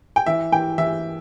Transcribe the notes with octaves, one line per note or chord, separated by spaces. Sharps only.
G5
E3 E5
E3 G5
E3 E5